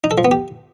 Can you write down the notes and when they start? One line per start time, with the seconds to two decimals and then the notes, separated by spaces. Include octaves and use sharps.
0.04 D#4
0.11 A4
0.18 F3
0.25 B3
0.31 G4